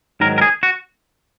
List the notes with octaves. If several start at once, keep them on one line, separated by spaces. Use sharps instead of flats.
G#2 D#3 F#3 A#4
A#4
G#4
F#4